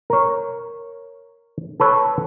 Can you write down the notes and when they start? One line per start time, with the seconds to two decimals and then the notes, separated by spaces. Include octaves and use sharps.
0.10 A#4 C#5
1.80 A4 B4 C#5